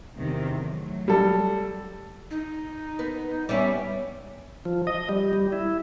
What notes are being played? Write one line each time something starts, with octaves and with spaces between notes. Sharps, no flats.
E2 C3 D#3
F#3 A3
G3 A4
D#4
B3
G3 B3 C#4 E5
F3
D#5
G3
G3
E4